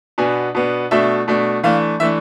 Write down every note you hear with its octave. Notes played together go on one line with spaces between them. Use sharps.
B2 B3 D4 G#5
B2 B3 D4
B2 A3 D4 E5
B2 A3 D4
E3 A3 D4 F5
E3 A3 D4 E5